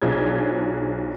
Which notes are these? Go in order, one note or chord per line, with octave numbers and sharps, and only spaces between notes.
B1 D4 F4 G#4 C5 G#6